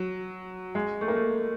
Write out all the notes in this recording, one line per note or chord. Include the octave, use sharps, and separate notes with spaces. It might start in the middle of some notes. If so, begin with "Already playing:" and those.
Already playing: F#3
G#3
A3
A#3
A3